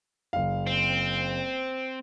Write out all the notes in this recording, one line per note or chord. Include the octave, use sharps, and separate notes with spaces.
F#1 F5
C4